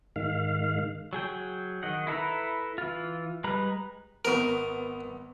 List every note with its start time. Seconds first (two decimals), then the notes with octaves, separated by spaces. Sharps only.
0.16 G#2 D#3 F5
1.13 F#3 G#4 G5
1.83 D#3 D#5 F#5
2.07 E4 A4 B4 A#5
2.78 E3 F4
3.44 G3 G#3 B4 A#5 B5
4.25 G#1 B3 A#4 C#6